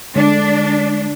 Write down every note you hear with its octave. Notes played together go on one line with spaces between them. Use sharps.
D3 G#3 D4